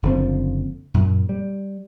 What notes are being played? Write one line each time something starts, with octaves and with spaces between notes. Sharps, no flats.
F#1 D3 F3 C4
F#2 A#2
G3